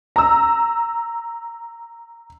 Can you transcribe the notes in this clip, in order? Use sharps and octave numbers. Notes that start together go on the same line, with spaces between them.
A#5 E6